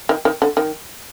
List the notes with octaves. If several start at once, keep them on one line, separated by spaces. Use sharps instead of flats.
D#3
D#3
D3
D#3